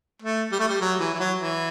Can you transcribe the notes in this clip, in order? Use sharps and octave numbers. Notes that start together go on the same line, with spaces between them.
A3
G3
A3
G3
F#3
E3
E3
F#3
E3